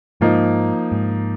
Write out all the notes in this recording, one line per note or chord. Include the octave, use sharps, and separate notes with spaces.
G#2 F3 A#3 D#4
G#2